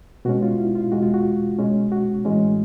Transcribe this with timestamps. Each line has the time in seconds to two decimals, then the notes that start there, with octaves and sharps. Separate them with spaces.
0.25 B2 G#3 C#4 F#4
0.42 F4
0.59 E4
0.75 F4
0.92 E2 B2 G#3 F#4
1.03 F4
1.14 F#4
1.58 B2 G#3 C#4
1.92 F#4
2.25 A2 E3 G#3 C#4